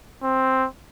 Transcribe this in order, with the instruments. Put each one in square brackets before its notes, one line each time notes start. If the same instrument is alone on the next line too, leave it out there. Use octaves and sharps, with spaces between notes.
[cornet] C4